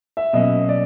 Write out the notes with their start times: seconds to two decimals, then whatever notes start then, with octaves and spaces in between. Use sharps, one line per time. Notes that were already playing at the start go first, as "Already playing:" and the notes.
0.17 E5
0.33 B2 F#3 A#3 C#4 D#5
0.69 D5